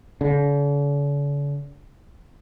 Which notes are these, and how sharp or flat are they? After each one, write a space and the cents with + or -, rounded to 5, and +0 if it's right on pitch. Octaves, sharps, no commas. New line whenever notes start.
D3 -45